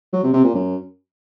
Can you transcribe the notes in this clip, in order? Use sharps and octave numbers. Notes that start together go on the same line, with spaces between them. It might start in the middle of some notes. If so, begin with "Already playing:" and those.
F#3
C3
C3
A#2
F#2